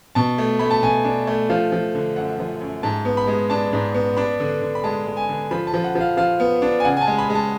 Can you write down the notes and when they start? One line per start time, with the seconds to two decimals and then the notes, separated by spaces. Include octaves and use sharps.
0.15 B2 A5
0.38 A3
0.59 A3 B5
0.71 A5
0.83 B2 G#5
1.05 D4
1.27 A3
1.50 F3 F5
1.72 F3
1.95 D3
2.16 F#2 F#5
2.39 F3
2.61 F#2
2.83 G#2 A5
3.05 B3
3.17 B5
3.27 G#3
3.50 D4 A5
3.73 G#2
3.94 B3
4.16 D4 B5
4.40 D3
4.62 D3
4.75 B5
4.84 G#3 A5
5.06 G#3
5.17 G#5
5.29 D3
5.51 F3 B5
5.67 A5
5.74 F3
5.84 F#5
5.95 F3
6.01 F5
6.17 F3 F5
6.40 B3
6.62 D4
6.80 G#5
6.85 C#3 F#5
6.97 G#5
7.01 A5
7.07 G#3
7.18 B5
7.30 G#3
7.35 A5